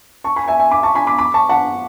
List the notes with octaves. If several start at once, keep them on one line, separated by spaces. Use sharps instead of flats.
A5 C#6
G#5 B5
E5 G#5
E5 G#5
B5 D6
A5 C#6
G#5 B5
B5 D6
B5 D6
A5 C#6
F#5 A5